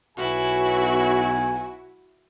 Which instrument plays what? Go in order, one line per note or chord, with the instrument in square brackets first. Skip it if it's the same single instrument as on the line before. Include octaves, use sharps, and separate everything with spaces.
[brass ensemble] B1 G#5 [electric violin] E4 F#4